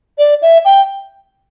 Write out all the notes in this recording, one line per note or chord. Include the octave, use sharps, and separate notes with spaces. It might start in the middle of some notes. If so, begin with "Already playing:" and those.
D5
E5
G5